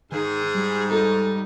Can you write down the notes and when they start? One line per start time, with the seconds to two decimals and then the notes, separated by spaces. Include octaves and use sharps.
0.12 G#2 D#3 G#4
0.55 G3
0.91 D#4 A4